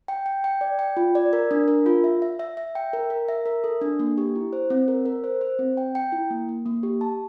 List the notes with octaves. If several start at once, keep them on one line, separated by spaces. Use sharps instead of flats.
G5
G5
G5
D5
G5
F4
D5
A#4
D4
A#4
F4
E5
E5
E5
E5
G5
A#4
A#4
E5
A#4
A4
D4
A#3
G4
E4
C5
C4
A#4
A#4
C5
C5
C4
G5
G5
E4
A#3
A#3
A#3
G4
A5